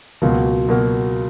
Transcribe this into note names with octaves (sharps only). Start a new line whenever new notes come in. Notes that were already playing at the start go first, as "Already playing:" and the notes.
C#2 B2 F#3 A#3
B2 F#3 A#3